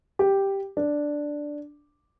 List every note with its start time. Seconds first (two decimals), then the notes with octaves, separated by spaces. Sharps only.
0.19 G4
0.77 D4